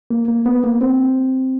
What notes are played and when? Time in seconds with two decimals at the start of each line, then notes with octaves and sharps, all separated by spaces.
0.10 A#3
0.28 A#3
0.46 B3
0.64 A#3
0.81 C4